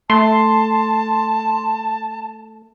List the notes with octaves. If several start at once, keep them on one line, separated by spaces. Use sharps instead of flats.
A3 A5 C6